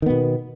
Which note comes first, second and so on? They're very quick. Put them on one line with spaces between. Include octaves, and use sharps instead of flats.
D#3 B3 B2